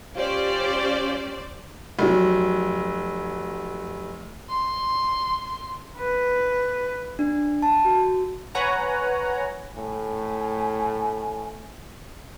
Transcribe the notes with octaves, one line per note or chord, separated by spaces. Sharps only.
C#4 F4 G4 C5 D5
F1 F#3
C6
B4
D4
A5
F#4
B4 C#5 F#5 G#5 A#5
A2 G#5